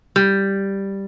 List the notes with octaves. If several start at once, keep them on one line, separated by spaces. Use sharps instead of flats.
G3